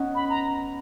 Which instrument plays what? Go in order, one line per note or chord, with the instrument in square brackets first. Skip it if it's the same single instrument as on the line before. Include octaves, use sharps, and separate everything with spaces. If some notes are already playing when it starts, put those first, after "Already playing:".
Already playing: [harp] B3 C#4 D#4
[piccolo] B5
A#5